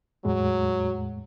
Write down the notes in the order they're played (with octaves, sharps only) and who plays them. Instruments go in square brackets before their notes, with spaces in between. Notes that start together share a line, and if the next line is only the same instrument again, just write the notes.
[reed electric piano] E2 A2 G#3 [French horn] F#3